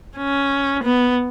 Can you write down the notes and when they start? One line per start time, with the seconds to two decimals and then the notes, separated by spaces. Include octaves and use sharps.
0.18 C#4
0.84 B3